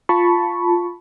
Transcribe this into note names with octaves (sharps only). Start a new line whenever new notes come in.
F4 A5 B5 C#6